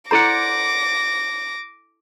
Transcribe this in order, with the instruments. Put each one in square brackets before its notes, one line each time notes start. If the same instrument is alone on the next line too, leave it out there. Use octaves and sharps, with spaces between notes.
[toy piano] E4 A4 A#5 [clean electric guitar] C5 D5 F#5 [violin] D6 A#6